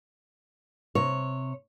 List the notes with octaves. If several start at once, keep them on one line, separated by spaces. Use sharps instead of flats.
C3 C#5